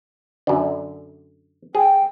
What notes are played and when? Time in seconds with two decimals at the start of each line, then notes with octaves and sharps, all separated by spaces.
0.47 F#2 D3
1.75 G#4 G5